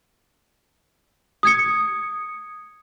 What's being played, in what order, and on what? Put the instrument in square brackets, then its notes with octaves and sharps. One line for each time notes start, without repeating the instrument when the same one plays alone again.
[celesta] D#6 G#6 C#7